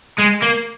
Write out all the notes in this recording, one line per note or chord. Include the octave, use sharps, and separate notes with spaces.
G#3
A#3